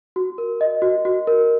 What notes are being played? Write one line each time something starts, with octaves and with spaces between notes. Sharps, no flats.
F#4
A#4
D#5
F#4
F#4
A#4